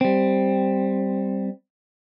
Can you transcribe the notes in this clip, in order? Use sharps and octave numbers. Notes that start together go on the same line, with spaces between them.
G3 C4